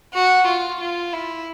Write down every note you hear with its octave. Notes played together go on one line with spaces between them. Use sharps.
F#4
F4
F4
E4